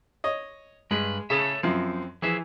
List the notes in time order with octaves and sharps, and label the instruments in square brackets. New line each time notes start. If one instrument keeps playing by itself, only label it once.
[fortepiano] C#5 D#5
[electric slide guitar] G2 B4 [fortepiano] G#3
[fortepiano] C#3 G#4 [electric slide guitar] A4 C#5 E5
[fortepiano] F#2 F3 [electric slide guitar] C4
[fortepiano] E3 [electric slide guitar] F3 G#4 E5